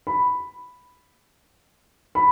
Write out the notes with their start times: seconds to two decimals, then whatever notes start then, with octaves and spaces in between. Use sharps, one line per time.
0.07 B5
2.15 B5